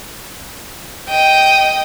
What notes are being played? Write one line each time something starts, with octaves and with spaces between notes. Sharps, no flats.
D#5 G5